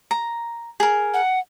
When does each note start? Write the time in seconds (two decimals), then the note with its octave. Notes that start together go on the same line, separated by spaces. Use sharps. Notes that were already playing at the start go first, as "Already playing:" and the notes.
0.11 A#5
0.80 G#4 A#4
1.14 F#5